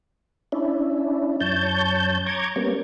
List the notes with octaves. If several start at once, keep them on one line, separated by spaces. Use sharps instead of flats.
C#4 D4 E4
F#2 C#5 A5 G6
A#5 C#6 D6 G#6
G3 A#3 B3 C#4